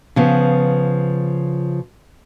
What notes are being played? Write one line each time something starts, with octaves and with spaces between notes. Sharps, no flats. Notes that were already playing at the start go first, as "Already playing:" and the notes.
C#3 F3 B3